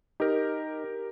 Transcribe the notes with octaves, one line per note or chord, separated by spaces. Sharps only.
D#4 G4 A#4